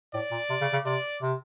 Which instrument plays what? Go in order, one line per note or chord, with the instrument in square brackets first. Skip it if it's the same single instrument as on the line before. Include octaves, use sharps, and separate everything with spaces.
[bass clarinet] A2 [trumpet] D5
[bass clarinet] A#2
C3
C#3
C#3
[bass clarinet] C3 [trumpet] D5
[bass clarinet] C3